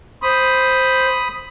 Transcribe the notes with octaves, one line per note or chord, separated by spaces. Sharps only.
C5 B5 D#6